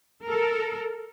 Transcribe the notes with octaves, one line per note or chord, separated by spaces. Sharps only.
A4 A#4